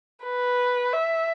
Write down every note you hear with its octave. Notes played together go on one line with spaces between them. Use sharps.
B4
E5